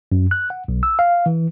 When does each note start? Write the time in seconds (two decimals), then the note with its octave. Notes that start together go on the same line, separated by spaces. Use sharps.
0.12 F#2
0.31 F#6
0.50 F#5
0.68 B1
0.83 E6
0.99 F5
1.26 E3